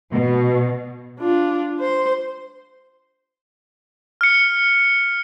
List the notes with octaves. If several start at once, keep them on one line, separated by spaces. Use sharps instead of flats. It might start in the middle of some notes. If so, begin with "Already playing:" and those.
B2
D4 F4
C5 C6
F6 C#7